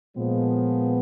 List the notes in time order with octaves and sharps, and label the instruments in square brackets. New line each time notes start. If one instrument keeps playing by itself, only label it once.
[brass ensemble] A#2 F3 G#3 B3